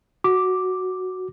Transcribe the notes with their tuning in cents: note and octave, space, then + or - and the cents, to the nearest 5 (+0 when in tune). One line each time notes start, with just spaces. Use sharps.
F#4 +0 D6 +0